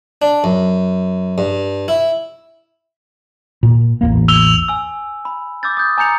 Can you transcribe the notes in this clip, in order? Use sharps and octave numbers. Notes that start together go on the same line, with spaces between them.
D4
F#2
G2
E4
A#2
A1 E2 A#3
E6 F7 G7
G#5 E6
B5
D6 E6 G6 A6
D#6 G6
G#5 A#5 G6 C#7 F7